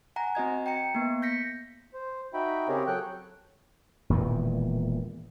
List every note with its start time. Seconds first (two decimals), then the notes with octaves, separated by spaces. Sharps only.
0.16 F#5 G#5 A#5
0.35 C4 F#4 D#5 G#6
0.66 G5 A#5 C#7
0.95 A#3 B3
1.22 G6 A#6 B6 C#7
1.94 C5
2.34 D#4 F#4 E5 G5 B5
2.68 C#3 C4 G4 G#4 A#4 C#5
2.87 F#3 A4 C#5 G5 F#6
4.10 E1 A#2 D#3 E3